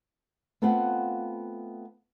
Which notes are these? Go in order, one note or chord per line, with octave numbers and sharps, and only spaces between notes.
A3 B3 C4 F4 F5 F#5